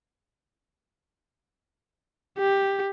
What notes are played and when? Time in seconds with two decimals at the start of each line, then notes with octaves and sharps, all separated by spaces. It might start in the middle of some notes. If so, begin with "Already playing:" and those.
2.39 G4